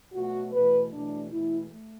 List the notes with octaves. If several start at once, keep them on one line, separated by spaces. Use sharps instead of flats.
B2 F#3 A3 F#4
E2 B2 A3 B4
E2 B2 F#3 A3 D4
E2 B2 A3 E4
A3